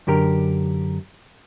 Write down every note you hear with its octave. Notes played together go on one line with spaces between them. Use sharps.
F#2 D3 G4 A#4